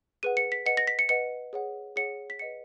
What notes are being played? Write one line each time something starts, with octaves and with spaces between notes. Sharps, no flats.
G#4 B4 F#5 D#7
C#7
B6
B4 D#5 F#5 C#7
A#6
B6
C#7
B4 D#5 F#5 C#7
G#4 C#5 F#5
G#4 C#5 F#5 C#7
B6
B4 D#5 F#5 C#7